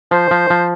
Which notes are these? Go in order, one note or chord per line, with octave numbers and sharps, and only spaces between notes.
F3 C5
F3
F3